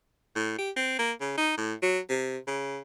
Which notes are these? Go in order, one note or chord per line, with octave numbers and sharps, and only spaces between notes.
A2
G4
C4
A#3
C#3
D#4
A2
F#3
C3
C#3